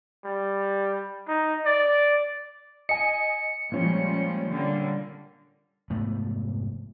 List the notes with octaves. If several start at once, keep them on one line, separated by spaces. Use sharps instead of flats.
G3
D#4
D5
D#5 G#5 C#7
A#2 F3 G3 G#3 C#4
D3 G3 A#3
F1 G#2 A3 B3